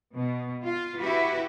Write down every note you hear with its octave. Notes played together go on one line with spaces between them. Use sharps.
B2
F4
E4 F#4 G4 B4